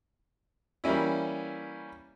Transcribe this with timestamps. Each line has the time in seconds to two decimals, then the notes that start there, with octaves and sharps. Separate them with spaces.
0.84 E3 G3 A#3 C#4 E4